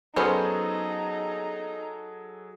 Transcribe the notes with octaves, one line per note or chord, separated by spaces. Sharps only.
F#3 B3 C#4 D#4 G#4 A4 C5